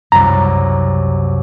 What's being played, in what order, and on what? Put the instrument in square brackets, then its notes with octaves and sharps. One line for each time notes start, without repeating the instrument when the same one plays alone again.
[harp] C2 F#2 [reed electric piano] A#5